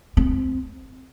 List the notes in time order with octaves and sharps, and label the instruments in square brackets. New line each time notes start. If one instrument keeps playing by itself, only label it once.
[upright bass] C4